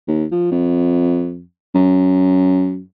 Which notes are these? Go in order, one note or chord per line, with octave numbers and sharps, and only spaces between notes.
D#2
F3
F2
F#2